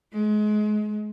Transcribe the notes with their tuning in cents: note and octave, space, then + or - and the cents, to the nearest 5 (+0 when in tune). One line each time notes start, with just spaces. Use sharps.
G#3 +30